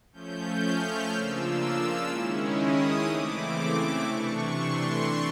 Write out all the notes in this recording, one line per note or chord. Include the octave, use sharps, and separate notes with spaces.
F3 A3 C#4 G6
F6
C#3 F3 A#3 D4 F4 E6
E6
D#3 G#3 C#4 E4
D#6
C#3 E3 A3 C4 E4 D6
C3 E3 A3 D4 C#6
C6